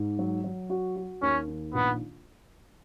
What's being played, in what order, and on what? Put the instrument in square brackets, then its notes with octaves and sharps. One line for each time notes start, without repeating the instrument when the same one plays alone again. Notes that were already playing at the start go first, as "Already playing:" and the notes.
Already playing: [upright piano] G#2
F#3
F#3
F#4
F#4
[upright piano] D#2 [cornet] C#4
[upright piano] D#3
[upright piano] A#1 [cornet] B3